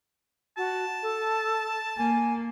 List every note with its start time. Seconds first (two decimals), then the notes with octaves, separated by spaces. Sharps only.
0.57 F#4 A5
1.03 A4
1.98 A#3 G#5